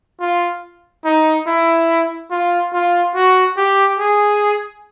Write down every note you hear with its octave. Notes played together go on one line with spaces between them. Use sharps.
F4
D#4
E4
F4
F4
F#4
G4
G#4